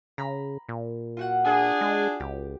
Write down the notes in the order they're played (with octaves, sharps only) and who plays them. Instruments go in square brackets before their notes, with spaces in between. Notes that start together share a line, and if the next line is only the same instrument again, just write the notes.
[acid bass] C#3 [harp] A#5 B5
[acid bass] A#2
[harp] F4 F#4 F#5
[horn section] D4 G#4
[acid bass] G#3
[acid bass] C#2 [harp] G4